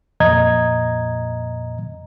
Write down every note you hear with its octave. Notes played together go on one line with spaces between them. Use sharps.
F2 A#2 D#5 A#5 G#6